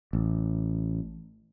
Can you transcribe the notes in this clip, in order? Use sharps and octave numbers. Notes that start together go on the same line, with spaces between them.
A1